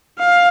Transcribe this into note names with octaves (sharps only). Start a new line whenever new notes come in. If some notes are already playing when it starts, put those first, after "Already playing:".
F5